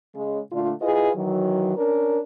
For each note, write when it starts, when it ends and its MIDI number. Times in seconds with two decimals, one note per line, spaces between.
0.16 0.40 49
0.16 0.40 56
0.52 0.73 46
0.52 0.73 50
0.52 0.73 57
0.52 0.73 62
0.52 0.73 65
0.82 1.10 64
0.82 1.10 65
0.82 1.10 68
0.82 1.10 71
0.82 1.10 75
1.16 1.74 51
1.16 1.74 52
1.16 1.74 54
1.77 2.20 61
1.77 2.20 62
1.77 2.20 70